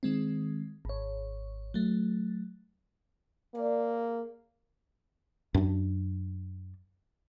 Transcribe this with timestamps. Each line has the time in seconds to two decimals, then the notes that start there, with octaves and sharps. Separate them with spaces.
0.03 D#3 G#3 C4
0.85 G#1 C#5
1.74 F#3 A3
3.55 A#3 G#4 D5
5.54 F#2 D4